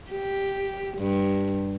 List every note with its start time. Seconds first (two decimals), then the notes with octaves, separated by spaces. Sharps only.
0.11 G4
0.98 G2